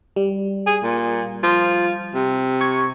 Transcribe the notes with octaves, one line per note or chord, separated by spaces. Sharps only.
G3
G#4
A#2
F3
C3
C#6 G#6